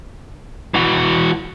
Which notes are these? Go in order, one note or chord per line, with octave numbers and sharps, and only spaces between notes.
E3 F#4